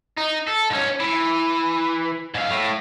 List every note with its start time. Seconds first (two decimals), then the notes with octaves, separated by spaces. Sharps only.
0.17 D#4
0.47 A4
0.70 G#2 C#4
1.00 E3
2.34 G#2 F5
2.51 A2